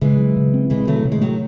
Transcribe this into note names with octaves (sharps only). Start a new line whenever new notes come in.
C#3 E3 G#3
F#3
C#3
C4
C3 E3 G#3
D#3 F#3 A3
C3
G#3
D#3 F#3 A3